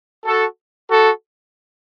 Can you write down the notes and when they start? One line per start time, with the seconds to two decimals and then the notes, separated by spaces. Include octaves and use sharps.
0.26 F#4 A4
0.91 F#4 A4